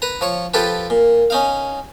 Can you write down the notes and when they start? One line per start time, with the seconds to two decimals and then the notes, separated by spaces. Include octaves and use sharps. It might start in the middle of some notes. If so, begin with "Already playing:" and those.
0.02 B4 A#5
0.21 F3 C#5
0.54 F3 F4 G4 A4 B4
0.90 A#2
1.30 C#4 D#4 F5